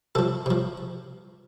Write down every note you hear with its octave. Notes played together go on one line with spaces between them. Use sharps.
C3 F3 A4
C3 F3